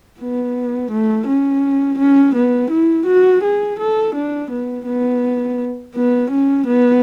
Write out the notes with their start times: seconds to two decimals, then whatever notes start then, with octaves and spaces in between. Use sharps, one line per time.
0.20 B3
0.91 A3
1.27 C#4
1.98 C#4
2.35 B3
2.71 E4
3.06 F#4
3.43 G#4
3.79 A4
4.15 D4
4.51 B3
4.86 B3
5.95 B3
6.30 C#4
6.66 B3